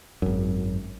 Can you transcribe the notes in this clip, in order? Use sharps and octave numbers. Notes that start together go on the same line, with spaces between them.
G#1 F#2